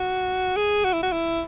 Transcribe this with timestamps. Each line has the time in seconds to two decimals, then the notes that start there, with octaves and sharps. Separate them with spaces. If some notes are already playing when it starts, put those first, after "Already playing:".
Already playing: F#4
0.56 G#4
0.84 F#4
0.93 E4
1.02 F#4
1.12 E4